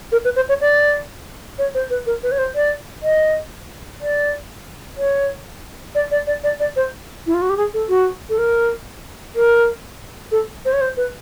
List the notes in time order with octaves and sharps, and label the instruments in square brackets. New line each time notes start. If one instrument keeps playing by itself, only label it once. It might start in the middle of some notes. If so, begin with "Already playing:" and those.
[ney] A#4
B4
C5
C#5
D5
C#5
C5
B4
A#4
B4
C#5
C5
D5
D#5
D5
C#5
D5
D5
D5
D5
D5
C5
E4
F4
F#4
G4
G#4
A4
F#4
A4
A#4
A#4
A4
C5
C#5
C5
B4